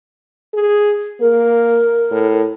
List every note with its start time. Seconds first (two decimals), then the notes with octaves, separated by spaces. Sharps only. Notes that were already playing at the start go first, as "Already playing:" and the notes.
0.54 G#4
1.20 A#3 A#4
2.11 A2